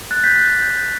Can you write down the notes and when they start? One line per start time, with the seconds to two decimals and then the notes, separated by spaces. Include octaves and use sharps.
0.11 F#6 A6
0.24 G6 B6
0.36 F#6 A6
0.48 G6
0.60 G6